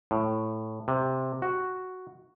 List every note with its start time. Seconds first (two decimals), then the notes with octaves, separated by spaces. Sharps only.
0.11 A2
0.88 C3
1.42 F#4